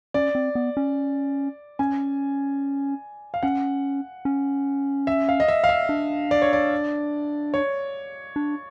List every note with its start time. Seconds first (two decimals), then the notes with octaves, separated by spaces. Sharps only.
0.14 C#4 D5
0.35 C4
0.55 B3
0.77 C#4
1.79 C#4 G#5
3.34 F5
3.43 C#4 F#5
4.25 C#4
5.07 E5
5.29 F5
5.40 D#5
5.48 E5
5.64 F5
5.69 E5
5.89 D4
6.31 D5
6.42 C#5
6.53 D5
7.54 C#5
8.36 D4